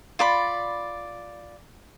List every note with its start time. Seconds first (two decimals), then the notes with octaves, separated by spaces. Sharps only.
0.19 F4 D5 B5